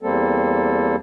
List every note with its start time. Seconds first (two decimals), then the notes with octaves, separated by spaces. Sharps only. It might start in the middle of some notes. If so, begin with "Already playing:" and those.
0.02 E2 G3 A#3 C4 A4